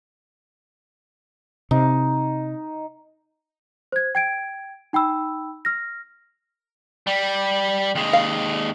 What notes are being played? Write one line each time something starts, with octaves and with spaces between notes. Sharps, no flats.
C3 D#4
C5 G#6
G5 G#6 D7
D#4 G5 B5 E6
F6 A#6
G3
D#2 G#3
F5